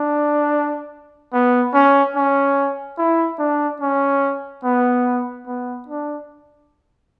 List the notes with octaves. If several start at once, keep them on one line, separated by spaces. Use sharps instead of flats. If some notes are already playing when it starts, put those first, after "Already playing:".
Already playing: D4
B3
C#4
C#4
E4
D4
C#4
B3
B3
D4